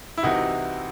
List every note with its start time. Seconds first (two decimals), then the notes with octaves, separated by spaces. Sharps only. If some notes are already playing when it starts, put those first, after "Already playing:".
0.18 E4
0.23 C2 C3 E3 D#4 F#4